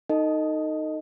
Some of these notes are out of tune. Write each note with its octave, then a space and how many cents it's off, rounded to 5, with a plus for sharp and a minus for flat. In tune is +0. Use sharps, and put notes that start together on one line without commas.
D#4 -5 A4 +30 D#5 +0